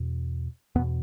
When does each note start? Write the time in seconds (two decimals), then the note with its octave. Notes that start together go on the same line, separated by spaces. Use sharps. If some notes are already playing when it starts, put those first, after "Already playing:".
Already playing: E2 B2
0.75 E2 B3
0.79 B2